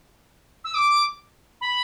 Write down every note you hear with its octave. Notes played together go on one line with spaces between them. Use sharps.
E6
D6
B5